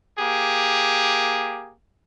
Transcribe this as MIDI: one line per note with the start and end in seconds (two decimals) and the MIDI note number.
0.19 1.74 58
0.19 1.74 67
0.19 1.74 68